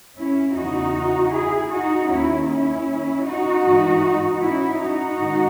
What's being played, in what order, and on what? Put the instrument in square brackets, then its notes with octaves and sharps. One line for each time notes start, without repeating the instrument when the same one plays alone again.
[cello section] C#4 E4
E2 C#3 E3 D#4 F#4
E4 G#4
D#4 F#4
D#2 D#3 C#4 E4
C#4 E4
D#4 F#4
G#2 E3
C#4 E4
D#4 F#4
G#2 D#3